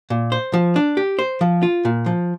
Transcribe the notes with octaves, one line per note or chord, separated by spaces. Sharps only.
A#2
C5
F3
D4
G4
C5
F3
F4
A#2
F3